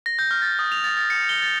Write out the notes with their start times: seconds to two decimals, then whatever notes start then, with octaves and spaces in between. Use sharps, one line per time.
0.06 A#6
0.19 G6
0.31 F6
0.42 A6
0.59 D#6
0.72 F7
0.84 A6
0.97 A6
1.10 C#7
1.29 G7
1.42 A6